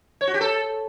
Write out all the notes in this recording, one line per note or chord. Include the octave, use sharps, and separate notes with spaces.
C#5
F#4
G4
A4